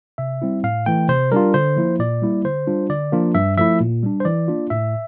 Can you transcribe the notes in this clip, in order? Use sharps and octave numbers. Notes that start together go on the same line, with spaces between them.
C3 E5
G3 C4 E4
A2 F5
E3 A3 G5
C3 C5
G3 D4 F4 A#4
D3 C5
F3 A#3 E4
A#2 D5
G3 A#3 E4
D3 C5
G3 D4 F4
D3 D5
F3 A#3 D4 F4
G2 E5
F3 A3 E4 E5
A#2
G3 D4
C5
E3 D5
A#3 D4 F4
A2 E5